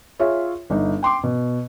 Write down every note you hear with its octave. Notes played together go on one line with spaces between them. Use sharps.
F4 G#4 C#5 E5
G1 D#4
G5 C6 D6
B2